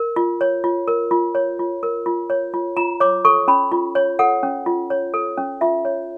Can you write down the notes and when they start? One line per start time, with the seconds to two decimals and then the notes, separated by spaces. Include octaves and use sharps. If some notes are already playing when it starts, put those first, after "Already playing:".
Already playing: A#4
0.16 F4
0.41 C#5
0.64 F4
0.88 A#4
1.11 F4
1.35 C#5
1.59 F4
1.83 A#4
2.06 F4
2.30 C#5
2.54 F4
2.77 F4 A#5
3.00 C#5 D6
3.25 A4 C#6
3.48 C#4 B5
3.72 F4
3.95 C#5
4.19 A4 F#5
4.43 C#4
4.66 F4
4.90 C#5
5.14 A4
5.38 C#4
5.61 F4 E5
5.85 C#5